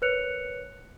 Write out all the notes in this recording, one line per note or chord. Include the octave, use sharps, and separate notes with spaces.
A#4 B4 C#5 F#6 C#7 F7